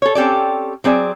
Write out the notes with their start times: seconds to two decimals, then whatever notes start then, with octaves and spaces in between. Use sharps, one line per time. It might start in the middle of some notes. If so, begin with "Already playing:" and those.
0.02 A4 C#5
0.15 C4 C#4 G4 A4 D5
0.84 F#3 C4 G#4 D5